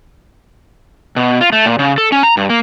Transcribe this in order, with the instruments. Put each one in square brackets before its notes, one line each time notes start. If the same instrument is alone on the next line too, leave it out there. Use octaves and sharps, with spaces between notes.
[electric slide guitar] B2
F4
A3
A#2
C#3
A4
C#4
A#5
G2
A#3